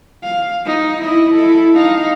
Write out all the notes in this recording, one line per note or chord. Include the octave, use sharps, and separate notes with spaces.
F5
D#4
E4 D#5
E4 A4
D#4 F5